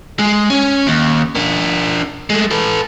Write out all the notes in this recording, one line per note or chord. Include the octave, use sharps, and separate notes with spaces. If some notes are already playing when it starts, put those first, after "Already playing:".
G#3
C#4
D#2
D4 A#4
G#3 A3
A4 B4